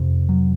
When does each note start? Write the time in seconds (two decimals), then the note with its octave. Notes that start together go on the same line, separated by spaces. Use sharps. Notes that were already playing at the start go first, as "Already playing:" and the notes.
Already playing: F2 C3
0.29 F#3